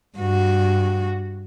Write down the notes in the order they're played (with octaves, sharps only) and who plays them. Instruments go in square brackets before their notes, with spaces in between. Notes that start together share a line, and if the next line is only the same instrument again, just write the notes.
[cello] G2 F#4